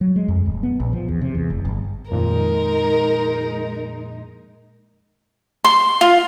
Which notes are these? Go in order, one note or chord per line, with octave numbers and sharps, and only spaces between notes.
F#3
G#3
F2
D1
B3
A#1
F3
E2
C3
E2
F1
G1
F2 A#2 D#3 G#3 D#4 A#4
C6
F4